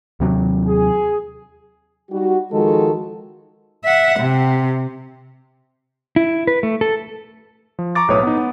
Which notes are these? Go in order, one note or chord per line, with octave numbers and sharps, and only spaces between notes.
D#2 C3 F#3
G#4
G3 D#4 F#4
D#3 F3 G#3 F#4 A4
E5 F#5
C3
E4
B4
A3
A4
F3
A#5 C#6 D6 A6
B1 A2 B4 C#5 D6 D#6
B3 D#4
B3